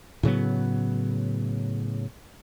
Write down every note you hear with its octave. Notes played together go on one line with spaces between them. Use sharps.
A2 C#3 F#3 B3